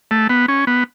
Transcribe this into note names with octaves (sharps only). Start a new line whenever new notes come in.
A3
B3
C#4
B3